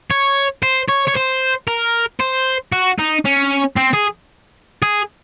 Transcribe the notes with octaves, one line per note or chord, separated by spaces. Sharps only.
C#5
C5
C#5
C#5
C5
A#4
C5
F#4
D#4
C#4
C4
G#4
G#4